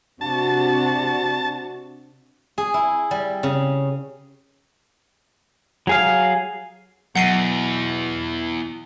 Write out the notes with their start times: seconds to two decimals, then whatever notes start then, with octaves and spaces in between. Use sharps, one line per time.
0.21 C3 D4 F#4 A5
2.58 G#4
2.74 E4
3.11 G3
3.43 C#3
5.87 F#3 G#4 F5
7.16 E2 B2 F#3 F#5 C7 D#7